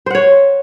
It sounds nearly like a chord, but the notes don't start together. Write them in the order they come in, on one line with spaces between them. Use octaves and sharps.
C5 F#5 C#5